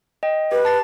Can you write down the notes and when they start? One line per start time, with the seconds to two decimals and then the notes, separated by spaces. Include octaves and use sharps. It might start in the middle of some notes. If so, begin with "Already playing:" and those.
0.23 D#5 G5
0.52 G4 B4
0.65 A5 A6 C7